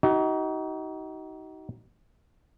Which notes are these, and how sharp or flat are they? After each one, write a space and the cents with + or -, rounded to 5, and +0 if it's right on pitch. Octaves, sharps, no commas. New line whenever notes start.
D#4 +25 F#4 +40